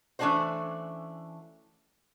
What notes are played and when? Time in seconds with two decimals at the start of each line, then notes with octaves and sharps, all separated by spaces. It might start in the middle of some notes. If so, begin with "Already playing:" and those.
0.19 E3 A3 C#4 D4 F#4 C5